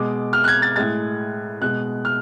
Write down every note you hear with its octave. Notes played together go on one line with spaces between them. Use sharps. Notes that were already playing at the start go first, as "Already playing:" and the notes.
Already playing: B2 G#3 D6
F6
F#6
G#6
A6
A2 G#3 A6
B2 G#3 F#6
F6